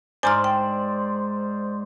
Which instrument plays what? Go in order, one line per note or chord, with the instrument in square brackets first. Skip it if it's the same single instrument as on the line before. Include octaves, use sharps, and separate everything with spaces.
[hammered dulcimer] G#2 C5 D5 [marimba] G#5 A#5 F6
[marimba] G5